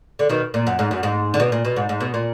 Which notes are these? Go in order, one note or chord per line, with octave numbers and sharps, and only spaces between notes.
D3
B2 D#3
A#2
F#2
G#2
F#2
G#2
D3
B2
A#2
B2
G#2
G#2
B2
A#2